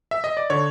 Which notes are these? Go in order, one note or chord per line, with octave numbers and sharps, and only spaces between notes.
E5
D#5
D5
D3 C#5